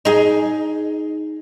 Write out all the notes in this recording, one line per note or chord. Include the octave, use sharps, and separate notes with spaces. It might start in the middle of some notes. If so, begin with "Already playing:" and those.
D#4 G#4